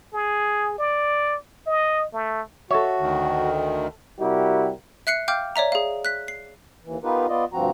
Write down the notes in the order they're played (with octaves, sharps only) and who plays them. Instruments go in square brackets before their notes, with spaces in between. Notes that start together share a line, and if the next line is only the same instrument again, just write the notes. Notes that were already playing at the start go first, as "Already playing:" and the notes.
[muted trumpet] G#4
D5
D#5
A3
[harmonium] F#4 [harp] A4 E5 [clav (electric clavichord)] C#5
[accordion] D2 D#3
[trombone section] C3 G3 E4 F#4 G4 A#4
[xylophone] E5 F#6 C7 C#7
F5 G5 D6 F6 G6
C#5 D5 E5 A#5
G#4 F5
F#6 B6
C7
[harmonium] D#2 E3
B3 D#4 F4 G4 A#4 B4
B3 F4 D5 D#5
D2 G2 F3 C4 F#4 A#5